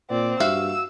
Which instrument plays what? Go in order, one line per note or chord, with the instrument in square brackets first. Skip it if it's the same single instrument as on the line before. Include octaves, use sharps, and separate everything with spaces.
[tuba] A#2 [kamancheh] C4 D5
[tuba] G2 [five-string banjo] F#4 E5 F5 [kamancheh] E6